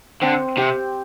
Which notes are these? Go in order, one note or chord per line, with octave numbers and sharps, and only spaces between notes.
D3 C4
C3 G4